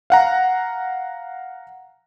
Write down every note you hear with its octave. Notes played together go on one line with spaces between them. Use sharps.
F5 F#5 A#5